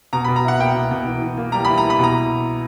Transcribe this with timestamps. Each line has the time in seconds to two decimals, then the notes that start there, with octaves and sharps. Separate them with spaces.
0.13 B2 A#5
0.24 B5
0.28 B2
0.36 A#5
0.44 E4 F#5
0.59 A#3 G5
0.75 B2
0.91 B2
1.06 E3
1.22 E3
1.37 A#3
1.52 G3 A#5
1.65 E3 B5
1.78 A#5
1.84 E3
1.90 B5
1.99 B2 A#5